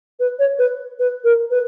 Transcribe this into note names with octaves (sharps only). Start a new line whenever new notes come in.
B4
C#5
B4
B4
A#4
B4